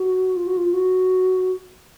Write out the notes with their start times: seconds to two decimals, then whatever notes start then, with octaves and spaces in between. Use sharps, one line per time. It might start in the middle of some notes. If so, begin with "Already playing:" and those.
Already playing: F#4
0.36 F4
0.47 F#4
0.57 F4
0.73 F#4